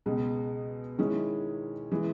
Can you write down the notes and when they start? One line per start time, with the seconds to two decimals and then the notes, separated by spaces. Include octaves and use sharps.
0.06 C#2 B2 G#3
0.98 D#3 G#3 C#4 E4
1.92 E3 G#3